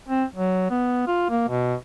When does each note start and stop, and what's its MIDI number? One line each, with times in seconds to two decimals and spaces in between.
0.09 0.24 60
0.34 0.67 54
0.70 1.02 59
1.07 1.25 65
1.29 1.44 58
1.48 1.75 47